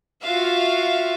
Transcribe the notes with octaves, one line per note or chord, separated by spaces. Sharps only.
F4 F#4 E5 F5